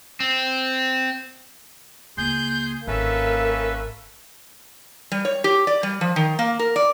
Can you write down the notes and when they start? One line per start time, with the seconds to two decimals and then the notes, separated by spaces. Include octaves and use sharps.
0.20 C4
2.17 C#2 A#3 G#4 C6 G6
2.87 G#1 A#3 C#4 A4 B4 E5
5.12 G3
5.25 C#5
5.44 G4
5.67 D5
5.83 G3
6.01 F3
6.16 D#3
6.39 A#3
6.59 A#4
6.76 D5